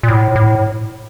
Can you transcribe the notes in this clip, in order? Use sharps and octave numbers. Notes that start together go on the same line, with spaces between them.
A#2
A2
A2